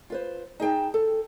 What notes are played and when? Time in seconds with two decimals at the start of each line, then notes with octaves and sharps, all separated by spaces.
0.10 F4 B4 C5
0.60 D#4 G#4 G5 A5
0.94 A4